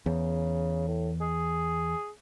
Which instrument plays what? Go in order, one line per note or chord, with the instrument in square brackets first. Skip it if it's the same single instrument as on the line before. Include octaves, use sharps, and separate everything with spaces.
[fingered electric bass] E2 [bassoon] C#3
[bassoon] A2
G#4